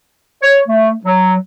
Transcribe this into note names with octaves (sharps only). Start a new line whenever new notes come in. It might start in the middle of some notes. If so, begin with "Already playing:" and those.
C#5
A3
F#3